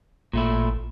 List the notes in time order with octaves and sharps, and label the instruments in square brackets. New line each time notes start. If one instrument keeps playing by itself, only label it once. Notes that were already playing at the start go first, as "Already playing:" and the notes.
[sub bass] A1 [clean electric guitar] A#2 A3 E4